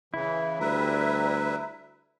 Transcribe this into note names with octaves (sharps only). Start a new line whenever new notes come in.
C#3 E3 E4
D2 G3 B4 E5 A#5